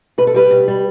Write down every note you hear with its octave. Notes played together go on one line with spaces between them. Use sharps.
B2 B4
A4
G3 G4 B4
B2
G3